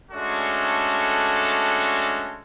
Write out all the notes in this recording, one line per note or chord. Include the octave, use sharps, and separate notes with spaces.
G#3 A3 C#4 D4 F#4 A4